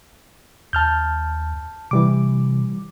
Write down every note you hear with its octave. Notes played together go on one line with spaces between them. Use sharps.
D#2 A5 F6 G6
C3 E3 G3 D6